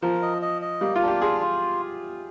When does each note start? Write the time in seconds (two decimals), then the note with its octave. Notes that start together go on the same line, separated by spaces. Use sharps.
0.02 F3 A#4
0.22 D#5
0.42 D#5
0.62 D#5
0.81 G3 A#3
0.96 F4
1.02 D4
1.08 G4
1.21 F4 G#4
1.41 F4